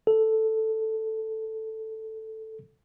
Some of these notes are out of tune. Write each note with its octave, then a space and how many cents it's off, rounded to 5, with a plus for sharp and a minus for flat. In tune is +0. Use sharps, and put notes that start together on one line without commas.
A4 +0